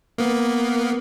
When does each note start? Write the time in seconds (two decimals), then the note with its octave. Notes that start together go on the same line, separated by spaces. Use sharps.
0.18 A#3 B3